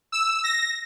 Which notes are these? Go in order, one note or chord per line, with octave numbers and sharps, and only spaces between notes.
E6
A#6